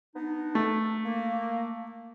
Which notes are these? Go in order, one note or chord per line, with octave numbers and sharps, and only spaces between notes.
B3 D4 D#4
A3
A#3